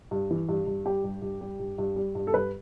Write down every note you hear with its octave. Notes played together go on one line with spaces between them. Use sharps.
G2
E3
G2
G2
G3 G4
G2
G2
G3
G2
G2
G3
G2
A4
G2 B4